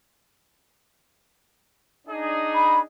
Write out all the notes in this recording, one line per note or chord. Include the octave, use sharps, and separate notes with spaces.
D4 D#4 G#4
B5